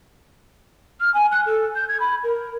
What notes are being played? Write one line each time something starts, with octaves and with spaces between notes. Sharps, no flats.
F6
G#5
F#6
A4
G6
G#6
B5
A#4